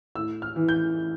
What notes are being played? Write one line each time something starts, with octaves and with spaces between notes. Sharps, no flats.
A2 E6
F6
E3
G6